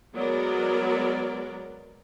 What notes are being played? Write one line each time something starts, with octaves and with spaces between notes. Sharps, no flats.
F#3 G#3 B3 A#4 D5